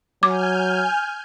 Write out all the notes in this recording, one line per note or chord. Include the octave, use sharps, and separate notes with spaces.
F#3 G#5 D6 F6 G6